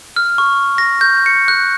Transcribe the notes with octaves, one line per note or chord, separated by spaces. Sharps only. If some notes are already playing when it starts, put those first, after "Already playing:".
F6
C#6
A#6
G6
C#7
F#6